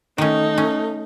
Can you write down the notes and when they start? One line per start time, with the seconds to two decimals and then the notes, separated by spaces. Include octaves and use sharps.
0.18 D#3 A3 C#4 D#4
0.58 C#4